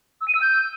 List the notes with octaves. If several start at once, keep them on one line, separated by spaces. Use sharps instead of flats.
E6
D#7
E6
G6